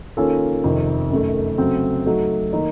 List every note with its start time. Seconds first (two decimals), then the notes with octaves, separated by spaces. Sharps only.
0.17 D#3 A#3 C#4 F4 A4
0.64 F2 C3 D#3
1.11 F#2 D#3 A3
1.58 C#3 F#3 A3 C4
2.06 F#3 A3 D#4 F#4 A4
2.53 D#3 A#3 D#4